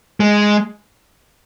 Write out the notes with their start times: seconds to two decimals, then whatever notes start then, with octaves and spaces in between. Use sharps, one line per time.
0.20 G#3